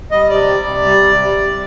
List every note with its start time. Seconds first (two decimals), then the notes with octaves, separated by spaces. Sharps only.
0.11 G3 D#5
0.30 C3 D5
0.48 G3
0.67 C3
0.85 G3
1.04 C3
1.22 G3
1.41 C3